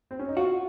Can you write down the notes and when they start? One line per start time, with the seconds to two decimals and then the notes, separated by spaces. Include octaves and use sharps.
0.11 C4
0.19 C#4
0.28 D#4
0.37 F4 F#4